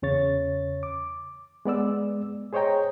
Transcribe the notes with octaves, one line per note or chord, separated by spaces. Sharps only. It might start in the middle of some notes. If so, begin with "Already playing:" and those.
E2 C#3 C#5 A6
D6
G#3 B3 D5 E6
G#4 C5 C#5 D#5 G5 A#5